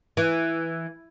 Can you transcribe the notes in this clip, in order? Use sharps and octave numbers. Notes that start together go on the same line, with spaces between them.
E3